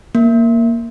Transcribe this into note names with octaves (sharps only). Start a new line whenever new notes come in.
A#3